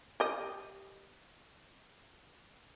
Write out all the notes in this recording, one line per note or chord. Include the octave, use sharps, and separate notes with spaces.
G4 D#5